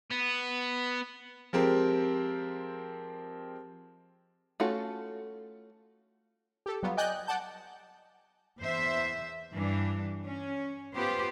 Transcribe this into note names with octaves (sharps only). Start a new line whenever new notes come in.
B3
F3 G#3 C4 G4 A#4
A3 C#4 F4 F#4 A4
G4 A4
F#3 G3 B3 F4
D5 D#5 G5 G#5 F#6 G6
D5 F#5 A5 G6
E2 C5 E5
G2 E3 G3 D4
C#4
B3 F4 G4 B4 C5